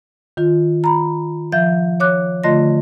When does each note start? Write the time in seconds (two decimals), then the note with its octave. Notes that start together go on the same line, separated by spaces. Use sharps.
0.37 D#3 F4
0.84 A#5 B5
1.52 F3 E5 G6
2.00 C#5 D6 F#6
2.44 D3 A3 F4 D#5 C6 A#6